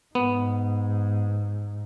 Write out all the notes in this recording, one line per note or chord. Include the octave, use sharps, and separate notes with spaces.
G#2 B3